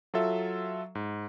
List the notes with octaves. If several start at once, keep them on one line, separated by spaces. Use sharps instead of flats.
F#3 F4 A4 E5
G#2